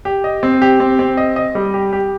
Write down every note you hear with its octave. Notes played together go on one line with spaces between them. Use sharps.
G4
D#5
C4
G4
C4
C4
D#5
D#5
G3
G4
G4